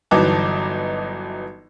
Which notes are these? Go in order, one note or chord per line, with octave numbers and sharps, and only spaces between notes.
G1 E3 F#3 D#4 A5 D6